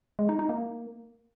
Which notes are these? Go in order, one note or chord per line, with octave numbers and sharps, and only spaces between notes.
G#3
D#4
D#4
A#3